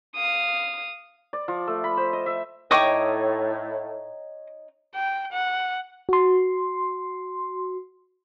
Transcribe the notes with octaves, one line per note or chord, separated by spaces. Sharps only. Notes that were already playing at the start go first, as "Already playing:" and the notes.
F5 D#6
D5
F3
A3
B5
C5
D#5
E5
A2 D#4 C#5 D#5 G5 C#6 D6
G5
F#5
F#4 C6